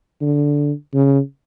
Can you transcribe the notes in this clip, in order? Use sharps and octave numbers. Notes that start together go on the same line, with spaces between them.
D3
C#3